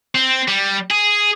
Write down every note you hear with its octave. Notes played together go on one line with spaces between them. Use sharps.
C4
G3
G#4